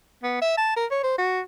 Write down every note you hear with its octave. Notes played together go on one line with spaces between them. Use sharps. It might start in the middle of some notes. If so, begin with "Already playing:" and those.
B3
E5
A5
A#4
C#5
C5
F#4